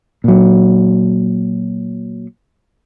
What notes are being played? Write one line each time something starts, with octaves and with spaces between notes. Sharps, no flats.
A#2 F#3